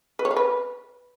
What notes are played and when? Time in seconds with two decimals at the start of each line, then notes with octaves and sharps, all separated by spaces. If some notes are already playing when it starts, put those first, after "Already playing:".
0.19 B4
0.25 C#5
0.31 F5
0.36 B4